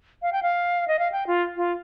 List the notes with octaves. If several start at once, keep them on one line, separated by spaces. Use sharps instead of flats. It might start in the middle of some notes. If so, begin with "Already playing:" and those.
F5
G5
F5
D#5
F5
G5
F4
F4